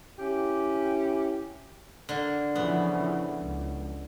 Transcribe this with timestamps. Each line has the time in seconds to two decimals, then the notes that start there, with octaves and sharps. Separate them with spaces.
0.18 C#4 E4 G4
2.09 D3 A#3
2.55 C#3 E3 F3 B3
3.40 C#2